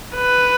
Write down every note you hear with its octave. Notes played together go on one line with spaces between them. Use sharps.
B4